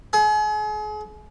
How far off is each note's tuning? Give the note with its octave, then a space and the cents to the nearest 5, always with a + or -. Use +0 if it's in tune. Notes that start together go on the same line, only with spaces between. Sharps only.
G#4 +35